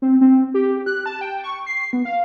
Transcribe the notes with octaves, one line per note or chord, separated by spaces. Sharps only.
C4
C4
G4
F#6
A5
G5
C#6
C7
B3
F5